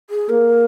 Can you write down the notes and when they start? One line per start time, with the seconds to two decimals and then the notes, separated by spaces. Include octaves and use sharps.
0.10 G#4
0.29 A#3 A#4